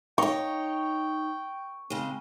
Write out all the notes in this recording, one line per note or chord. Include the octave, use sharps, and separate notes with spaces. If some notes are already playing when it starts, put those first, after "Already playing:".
D#4 C#5 G5 C#6
C#3 G#3 C4